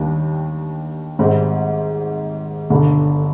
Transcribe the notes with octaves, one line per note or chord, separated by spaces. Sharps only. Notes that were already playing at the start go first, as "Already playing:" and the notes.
Already playing: D#2 D#3 G3 D4
G#1 G#2 G3 C4
G1 G2 D3